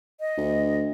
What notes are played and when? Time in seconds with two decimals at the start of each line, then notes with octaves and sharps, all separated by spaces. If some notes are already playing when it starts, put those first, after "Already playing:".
0.20 D#5
0.38 D2